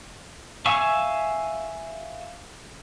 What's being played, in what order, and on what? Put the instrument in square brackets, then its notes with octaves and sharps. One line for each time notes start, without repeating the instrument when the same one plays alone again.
[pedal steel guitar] E5 F5 G#5 C#6 E6